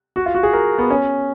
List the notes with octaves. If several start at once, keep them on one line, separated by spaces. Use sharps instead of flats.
F#4
F4
F#4
G#4
A#4
B3
C#4